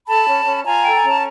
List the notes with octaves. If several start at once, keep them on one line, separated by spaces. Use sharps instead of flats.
A4 A5 B5
C#4
C#4
F4 G#5 A#5
A4 G5
G#5
C#4 A5